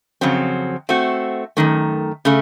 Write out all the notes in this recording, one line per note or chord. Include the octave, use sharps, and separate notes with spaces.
F2 C#3 F#3 C4
A3 C4 F#4
F#2 D#3 A3
C#3 A3